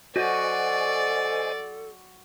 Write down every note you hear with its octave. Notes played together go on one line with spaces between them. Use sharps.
F#4 A4 C5 D5 D#5 G#5